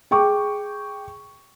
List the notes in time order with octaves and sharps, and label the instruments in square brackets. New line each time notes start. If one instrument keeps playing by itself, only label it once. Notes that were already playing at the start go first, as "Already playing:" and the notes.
[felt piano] G#4 G5 C#6 D6